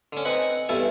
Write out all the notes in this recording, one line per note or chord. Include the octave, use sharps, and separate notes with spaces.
D3 C#4
C4 D#4 B4 F#5 G#5 B5
E2 G2 E4 A4 G#5